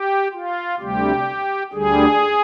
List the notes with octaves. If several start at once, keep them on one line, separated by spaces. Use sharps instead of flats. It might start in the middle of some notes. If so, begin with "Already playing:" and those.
Already playing: G4
F4
D2 C3 G3 G4
D2 D3 G3 G#4